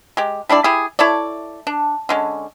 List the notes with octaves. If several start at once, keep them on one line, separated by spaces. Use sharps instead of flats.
G#3 G4
G3 D4 E4 D5
E4 G4 G#4
E4 A4 C#5 D5
D4
D3 G#3 C#4